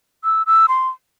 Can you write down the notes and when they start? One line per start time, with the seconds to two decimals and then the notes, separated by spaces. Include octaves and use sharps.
0.24 E6
0.47 E6
0.69 C6